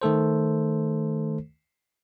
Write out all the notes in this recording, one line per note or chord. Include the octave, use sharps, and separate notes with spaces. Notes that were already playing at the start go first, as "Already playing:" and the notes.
D#3 A3 A4 C5